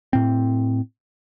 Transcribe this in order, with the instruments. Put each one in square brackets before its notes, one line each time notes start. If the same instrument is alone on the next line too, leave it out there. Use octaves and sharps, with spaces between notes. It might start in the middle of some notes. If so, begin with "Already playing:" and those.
[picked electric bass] A2 C4